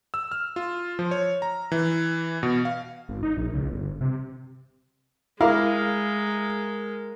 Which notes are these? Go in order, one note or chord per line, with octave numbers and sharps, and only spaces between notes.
E6
F6
F4
F3
C#5
A#5
E3
B2
F5
G#1
D#4
A#1
C#2
G1
C3
G#3 A#3 E4 A#4 F5